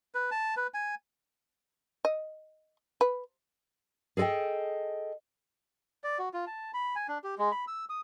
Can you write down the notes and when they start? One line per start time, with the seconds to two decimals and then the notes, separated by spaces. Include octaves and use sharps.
0.15 B4
0.31 A5
0.57 B4
0.74 G#5
2.05 D#5
3.01 B4
4.17 G#4 A4 D5 D#5 G5
6.04 D5
6.19 F#4
6.34 F4
6.47 A5
6.74 B5
6.96 G#5
7.08 D4
7.24 G4
7.38 G#3
7.52 B5
7.68 E6
7.90 D#6